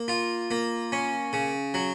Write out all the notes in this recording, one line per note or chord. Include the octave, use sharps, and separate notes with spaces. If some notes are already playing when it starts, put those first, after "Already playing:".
Already playing: A#3
F4
A#3
C#4
C#3
F#3